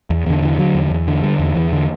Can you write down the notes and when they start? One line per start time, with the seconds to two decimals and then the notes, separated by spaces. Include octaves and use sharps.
0.10 E2
0.26 E2 D3
0.42 D3 E3
0.58 D3 F#3
0.75 E2
0.90 E2
1.08 D3
1.23 D3 G3
1.39 E2
1.55 E2 E3
1.73 D3